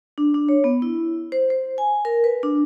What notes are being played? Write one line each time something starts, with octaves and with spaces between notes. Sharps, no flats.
D4
D4
C#5
B3
E4
C5
C5
G#5
A#4
B4
D4